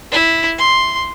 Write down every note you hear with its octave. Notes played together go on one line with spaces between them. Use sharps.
E4
C6